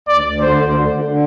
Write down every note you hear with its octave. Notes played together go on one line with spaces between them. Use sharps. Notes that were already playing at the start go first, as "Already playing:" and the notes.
D2 D5
D2
D3 C5
D2
D3
D3
D3